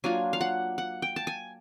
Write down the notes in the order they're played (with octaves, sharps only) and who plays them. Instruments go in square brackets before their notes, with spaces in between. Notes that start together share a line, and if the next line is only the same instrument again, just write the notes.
[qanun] F#3 A#3 D4 F4 G#5
F5
F#5
F#5
G5
A5
G#5